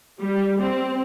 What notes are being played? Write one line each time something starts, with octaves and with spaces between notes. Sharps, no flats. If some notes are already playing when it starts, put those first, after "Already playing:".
G3
C4